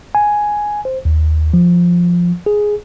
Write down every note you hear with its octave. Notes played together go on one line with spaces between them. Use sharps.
G#5
C5
D#2
F3
G#4